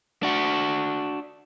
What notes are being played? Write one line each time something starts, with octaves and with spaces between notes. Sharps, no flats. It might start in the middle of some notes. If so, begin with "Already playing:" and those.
D4 F#4